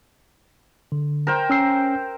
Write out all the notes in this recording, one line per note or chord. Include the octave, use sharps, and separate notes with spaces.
D3
A#4 C5 G5
C#4 E6 C7